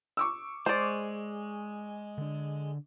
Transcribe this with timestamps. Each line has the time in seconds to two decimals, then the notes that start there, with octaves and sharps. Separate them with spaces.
0.17 C#6 D6 E6
0.66 G#3 C5 D5
2.18 D3 D4